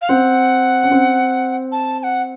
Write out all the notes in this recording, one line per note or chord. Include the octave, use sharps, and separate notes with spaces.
F5
C4 F#5
C#4
C4
A5
A5
F#5